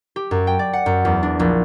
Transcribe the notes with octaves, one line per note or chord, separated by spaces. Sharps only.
G4
F#2
G5
D5
F#5
F#2
E2
D4
A#1